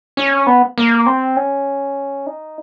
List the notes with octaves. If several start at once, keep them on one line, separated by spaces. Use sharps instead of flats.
C#4
B3
A#3
C4
C#4
D#4